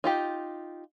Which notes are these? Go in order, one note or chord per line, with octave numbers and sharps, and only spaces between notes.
D#4 F4 G4